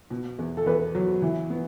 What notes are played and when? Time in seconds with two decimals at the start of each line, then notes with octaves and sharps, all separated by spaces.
0.10 B2
0.39 E2
0.57 A4
0.66 E2 B4
0.95 F#3
1.22 E3
1.50 B3